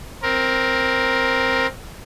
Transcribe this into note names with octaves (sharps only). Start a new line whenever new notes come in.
C4 A#4